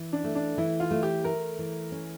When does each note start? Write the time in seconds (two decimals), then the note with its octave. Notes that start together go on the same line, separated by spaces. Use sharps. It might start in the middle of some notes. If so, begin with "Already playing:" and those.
Already playing: E3
0.13 D4
0.24 A3
0.35 D4
0.58 E3 E4
0.80 F4
0.91 A3
1.03 G4
1.24 A3 A#4
1.59 E3
1.92 C#4